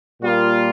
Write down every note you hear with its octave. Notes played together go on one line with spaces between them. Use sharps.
A#2 G3 A#3 F4